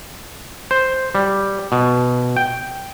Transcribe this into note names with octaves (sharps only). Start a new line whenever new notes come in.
C5
G3
B2
G5